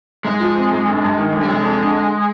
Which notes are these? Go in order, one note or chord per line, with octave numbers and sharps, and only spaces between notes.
G#2 G#3
F3
C4
G#2
G1
G2
D#3
G1
G3
F1 G#3
F2
D3